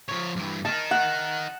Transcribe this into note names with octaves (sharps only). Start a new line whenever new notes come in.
F3 C#5
G2 E3
D#4 A#4 A5
F#5